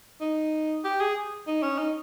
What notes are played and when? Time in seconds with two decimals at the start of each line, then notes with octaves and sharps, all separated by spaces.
0.21 D#4
0.84 G4
1.00 G#4
1.47 D#4
1.63 C#4
1.79 D#4